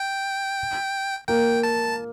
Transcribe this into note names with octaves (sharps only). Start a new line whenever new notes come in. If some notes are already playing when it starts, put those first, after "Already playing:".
Already playing: G5
A#3 G5
A5